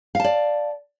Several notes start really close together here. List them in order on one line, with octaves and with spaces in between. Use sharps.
F5 A5 D5